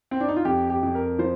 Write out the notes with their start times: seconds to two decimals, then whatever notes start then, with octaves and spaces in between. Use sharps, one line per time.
0.11 C4
0.20 D4
0.28 D#4
0.37 F4
0.45 F2 G4
0.70 G4
0.83 F2
0.95 A#4
1.19 F3 C5